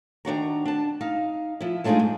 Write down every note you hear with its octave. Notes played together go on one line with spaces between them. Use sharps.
D#3 D4 F#4 A#5
D4 A5
D#4 F5
F3 E4
G#3 A3 D4 D#4 F4 G#4
G#2